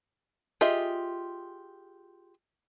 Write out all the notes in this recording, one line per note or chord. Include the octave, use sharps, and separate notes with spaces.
F4 G4 G#4 D#5 E5